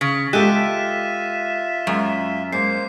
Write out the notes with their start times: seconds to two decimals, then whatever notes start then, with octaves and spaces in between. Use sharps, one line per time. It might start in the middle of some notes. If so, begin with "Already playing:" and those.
0.01 C#3 B6
0.33 G#3 F4 G4 A4 E5 F#6 D#7 E7
1.87 F#2 G#3
2.52 G#3 A#3 C5 C7